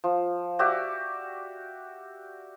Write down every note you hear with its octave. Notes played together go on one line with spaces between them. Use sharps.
F3
F#4 G4 D5 E5